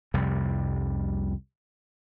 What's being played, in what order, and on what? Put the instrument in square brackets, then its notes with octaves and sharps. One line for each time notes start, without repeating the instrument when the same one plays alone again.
[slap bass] C2 F2 C3 G3